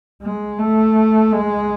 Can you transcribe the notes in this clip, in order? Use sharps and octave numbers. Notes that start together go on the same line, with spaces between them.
G#3
A3
G#3